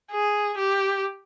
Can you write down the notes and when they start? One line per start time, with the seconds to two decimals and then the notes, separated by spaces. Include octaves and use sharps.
0.11 G#4
0.58 G4